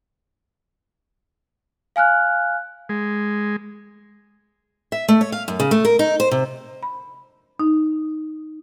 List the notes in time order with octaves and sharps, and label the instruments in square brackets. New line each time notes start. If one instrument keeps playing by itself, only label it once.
[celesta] F5 G#5 F6 F#6
[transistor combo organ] G#3
[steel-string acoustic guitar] E5
A3
C#5
F5
F#2
C#3
A3
A#4
D#4
C5
C3
[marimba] B5
D#4